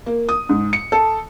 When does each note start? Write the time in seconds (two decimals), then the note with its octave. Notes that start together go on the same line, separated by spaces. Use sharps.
0.06 A#3
0.29 D#6
0.49 G#2
0.73 C#7
0.92 A4